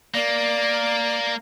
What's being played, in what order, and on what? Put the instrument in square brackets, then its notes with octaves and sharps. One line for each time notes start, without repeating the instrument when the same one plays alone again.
[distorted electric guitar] A#3 [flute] D5